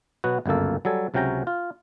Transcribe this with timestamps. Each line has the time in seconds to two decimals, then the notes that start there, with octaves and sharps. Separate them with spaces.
0.24 B2 F#3 B3 F#4
0.46 G1 C#2 F#2 A#3 A4
0.85 F#3 G3 A4 G#5
1.14 C#2 C3 F#3 C#4 G5 A#5
1.47 F4